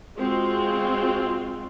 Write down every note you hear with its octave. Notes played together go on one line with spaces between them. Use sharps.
G#3 C4 F4 F#4